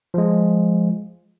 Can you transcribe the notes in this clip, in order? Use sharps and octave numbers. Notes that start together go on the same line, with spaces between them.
F3 G#3